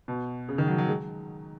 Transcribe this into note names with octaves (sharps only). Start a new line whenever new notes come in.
B2
C#3
D#3
F#3
F#3
G#3